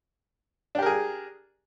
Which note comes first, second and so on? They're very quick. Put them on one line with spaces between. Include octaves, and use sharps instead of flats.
D4 G4 A#4 G#4